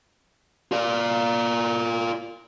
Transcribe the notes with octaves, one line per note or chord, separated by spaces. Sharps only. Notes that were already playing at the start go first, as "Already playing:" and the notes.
F4 D5